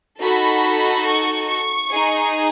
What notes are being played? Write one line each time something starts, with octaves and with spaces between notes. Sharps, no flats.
D#4 F#4 A4 B5
C#6
C#6
D#4 G#4